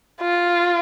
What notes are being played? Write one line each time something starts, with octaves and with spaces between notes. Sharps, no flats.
F4